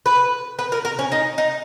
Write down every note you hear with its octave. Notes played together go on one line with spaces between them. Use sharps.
B4
B4
A#4
A#4
C#4
D#4
D#4